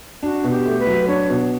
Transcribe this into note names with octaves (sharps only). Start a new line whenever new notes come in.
D4 F#4
B2
G4
A3
B4
F#3
D4 C#5
B2